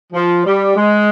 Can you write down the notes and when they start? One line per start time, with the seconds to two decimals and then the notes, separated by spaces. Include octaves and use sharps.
0.13 F3
0.45 G3
0.76 G#3